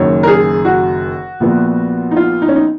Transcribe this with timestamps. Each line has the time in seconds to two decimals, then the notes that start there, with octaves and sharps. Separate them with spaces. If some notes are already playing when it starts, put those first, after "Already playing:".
Already playing: F#1 F#2 D#3 C#5
0.23 A#4
0.27 G#4
0.65 F#4
1.40 A#1 A#2 F3 B3
2.11 D#4
2.16 F4
2.42 D#4
2.49 C#4
2.56 D#4